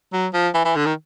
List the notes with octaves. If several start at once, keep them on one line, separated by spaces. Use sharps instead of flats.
F#3
F3
E3
E3
D3
D#3